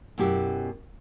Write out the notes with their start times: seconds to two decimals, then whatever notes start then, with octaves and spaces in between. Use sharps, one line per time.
0.18 F#2 B2 E4 G4